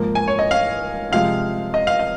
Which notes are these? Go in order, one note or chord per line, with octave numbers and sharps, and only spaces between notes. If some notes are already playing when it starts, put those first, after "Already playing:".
Already playing: G#2 F3 A#3
G#5
C#5
D#5
F5
C3 F3 G#3 F5
D#5
F5
D#5